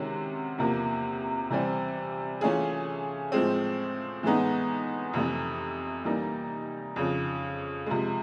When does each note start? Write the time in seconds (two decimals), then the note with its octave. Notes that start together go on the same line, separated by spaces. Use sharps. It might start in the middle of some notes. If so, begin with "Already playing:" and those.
Already playing: C3 D#3 G#3 C#4 F#4
0.58 E2 C3 F3 A#3
1.50 C3 E3 G3 C4
2.41 E3 A3 C#4 F4 G#4
3.32 A2 F3 G#3 C4
4.23 A2 E3 G#3 B3 D#4
5.13 F2 C3 E3 A3
6.05 E3 G3 A#3 D#4
6.96 F2 C#3 F3
7.86 C3 F3 G#3